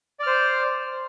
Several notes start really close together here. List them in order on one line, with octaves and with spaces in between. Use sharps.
D5 F6 C5